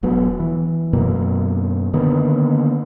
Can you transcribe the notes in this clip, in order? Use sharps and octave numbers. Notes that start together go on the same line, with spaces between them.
E1 F#3 B3
E3
F#2 B2 A#3
D3 D#3 A#3 B3